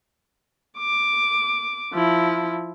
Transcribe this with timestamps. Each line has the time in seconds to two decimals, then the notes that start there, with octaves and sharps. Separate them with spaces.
0.78 D6
1.93 F3 E4